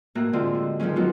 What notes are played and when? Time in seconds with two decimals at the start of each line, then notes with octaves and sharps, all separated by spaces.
0.15 A2 A#3 F#4 A#5 F#6
0.33 A2 D3 F3 G#3 C4 F4
0.54 F#4
0.80 D#3 F3 F#3 G#3 C#4
0.96 F#3 G#3 B3 D#4 F4 F#4